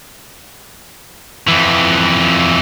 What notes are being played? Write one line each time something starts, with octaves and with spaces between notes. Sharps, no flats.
F2 E3